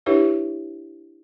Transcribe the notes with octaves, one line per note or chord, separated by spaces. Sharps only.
D4 E4 G4 B4 C#5 E5